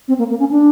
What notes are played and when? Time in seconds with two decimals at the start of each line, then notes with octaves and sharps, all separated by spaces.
0.08 C4
0.19 A#3
0.30 A#3
0.39 C#4
0.51 D4